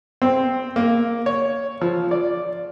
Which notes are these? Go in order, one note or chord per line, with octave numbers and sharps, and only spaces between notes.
C4
A#3
C#5
F3
D5